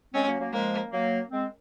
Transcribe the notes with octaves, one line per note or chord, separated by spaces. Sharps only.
G#3 C4 C#4
F#3 A#3
F#3 A#3
F3 G#3 A#3
F#3 A#3
G#3 C4